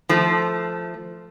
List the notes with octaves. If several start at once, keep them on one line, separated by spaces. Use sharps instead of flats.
F3 A3